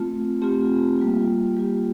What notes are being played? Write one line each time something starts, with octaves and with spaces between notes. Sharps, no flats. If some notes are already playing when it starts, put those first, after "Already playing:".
Already playing: A3 C4 F4
A3 C4 F4 G4
G3 A#3 F4
G3 A#3 F4 G4